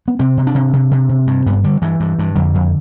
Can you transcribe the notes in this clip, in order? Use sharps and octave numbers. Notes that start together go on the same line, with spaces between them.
B3
C3 C4
C3
D4
C3
C3
C3
C3
G2
G2 B3
D3 G3
G2 E3
G2
G2
F2 D3
F2